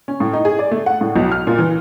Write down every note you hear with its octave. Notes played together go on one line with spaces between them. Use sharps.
C#4
A2
D#4
G#4
D5
A3
F#5
A2
B1
F6
A#2
E3